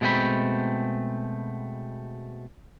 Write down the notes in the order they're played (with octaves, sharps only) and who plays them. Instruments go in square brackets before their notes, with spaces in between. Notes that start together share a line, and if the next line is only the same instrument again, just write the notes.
[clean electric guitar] B2 G#3 A3 C4 G5 B5